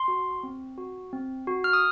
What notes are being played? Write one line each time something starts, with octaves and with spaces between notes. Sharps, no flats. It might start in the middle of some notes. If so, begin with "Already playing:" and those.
Already playing: C6
F#4
C4
F#4
C4
F#4
F6
D#6